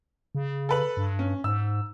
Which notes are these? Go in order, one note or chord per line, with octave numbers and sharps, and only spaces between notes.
C#3
A4 B4 F#7
G2
C#4
G#2 E6